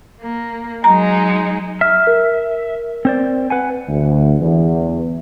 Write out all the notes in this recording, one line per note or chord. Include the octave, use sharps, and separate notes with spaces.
A#3
F#3 G#3 D#4 A#5
E5 F6
A#4
C4 C5 D5
B4 F#5 G#5
D2
E2